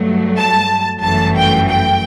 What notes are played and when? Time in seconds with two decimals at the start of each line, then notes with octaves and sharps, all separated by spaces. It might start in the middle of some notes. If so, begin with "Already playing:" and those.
Already playing: G2 F#3 A3
0.37 A5
1.03 G1 F#2 E3 A3 A5
1.37 G5
1.70 G5